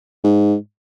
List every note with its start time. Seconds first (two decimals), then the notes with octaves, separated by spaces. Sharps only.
0.24 G#2